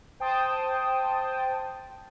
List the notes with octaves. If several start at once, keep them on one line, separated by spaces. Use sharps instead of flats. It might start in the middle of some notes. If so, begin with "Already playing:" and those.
C5 G5 A5 D#6